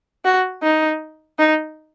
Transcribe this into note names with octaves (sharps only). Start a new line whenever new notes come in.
F#4
D#4
D#4